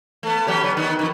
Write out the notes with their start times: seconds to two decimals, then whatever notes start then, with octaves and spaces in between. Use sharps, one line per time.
0.23 A3 B3
0.47 F#3 C#4 G4
0.63 C#3 B3
0.77 D#3 B3
0.99 F2 D#3